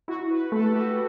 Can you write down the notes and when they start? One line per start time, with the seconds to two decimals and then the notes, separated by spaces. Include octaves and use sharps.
0.08 E4 F#4
0.30 B4
0.51 A3 A4
0.68 G4
0.73 F#4